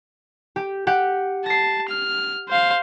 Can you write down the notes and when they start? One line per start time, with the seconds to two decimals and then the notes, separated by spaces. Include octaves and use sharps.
0.56 G4
0.87 G4 F#5
1.46 A5 A#6 C7
1.89 F6
2.49 C5 F5